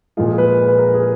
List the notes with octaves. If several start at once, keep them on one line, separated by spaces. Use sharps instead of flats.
A#2 F3 G#3 F4
G#4
B4
B4
A#4
G#4